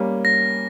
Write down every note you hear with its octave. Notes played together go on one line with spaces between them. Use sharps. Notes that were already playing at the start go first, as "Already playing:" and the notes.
Already playing: G3 A#3 C#4
A#6